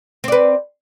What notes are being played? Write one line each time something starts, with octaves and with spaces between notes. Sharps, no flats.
C4 B4 D5